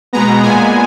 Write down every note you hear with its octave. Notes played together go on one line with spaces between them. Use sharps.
B2 G#3 B3 A#5
A#2 G#3 B3 G#5